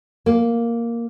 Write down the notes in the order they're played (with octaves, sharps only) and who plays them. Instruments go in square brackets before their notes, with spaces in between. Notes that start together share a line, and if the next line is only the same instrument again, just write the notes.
[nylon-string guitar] A#3